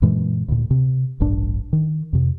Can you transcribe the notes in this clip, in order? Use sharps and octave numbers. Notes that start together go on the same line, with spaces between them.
F#2 A#2 E3 G#3
D2 A#2
C3
D1 A1 G2 D4
D#3
F2 C3